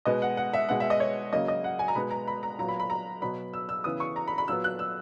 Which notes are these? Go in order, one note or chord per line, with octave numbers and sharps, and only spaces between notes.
B2 G#3 B3 D#5
F#5
F#5
E5
B2 G#3 B3 F#5
E5
D#5
C#5
C#3 F#3 A#3 D#5
D#5
F#5
G#5
A#5
B2 G#3 B3 B5
A#5
B5
A#5
A#2 F#3 B3 A#5
B5
B5
A#5
B2 F#3 B3 B5
E6
E6
C#3 E3 B3 D#6
C#6
A#5
B5
B5
A#2 F#3 B3 E6
F#6
E6